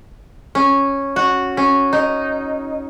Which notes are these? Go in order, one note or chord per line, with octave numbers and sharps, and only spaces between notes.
C#4
F#4
C#4
D#4